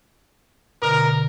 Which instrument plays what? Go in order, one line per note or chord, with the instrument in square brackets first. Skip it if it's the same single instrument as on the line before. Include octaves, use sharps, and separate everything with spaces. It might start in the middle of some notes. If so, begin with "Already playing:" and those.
[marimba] B2 D3 [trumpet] A#4